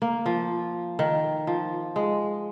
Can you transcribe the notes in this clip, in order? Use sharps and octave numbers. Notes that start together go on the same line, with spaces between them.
A#3
F3
D#3
F3
G#3